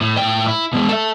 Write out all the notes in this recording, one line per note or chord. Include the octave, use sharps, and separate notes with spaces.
A2
A2 G5
E4
B2 G#3
A4 E5